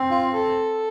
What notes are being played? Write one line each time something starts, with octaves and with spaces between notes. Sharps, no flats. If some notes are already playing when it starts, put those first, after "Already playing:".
Already playing: C4
F4
A4